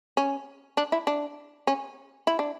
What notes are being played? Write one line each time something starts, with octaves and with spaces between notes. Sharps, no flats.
C#4
D4
E4
D4
C#4
E4
D4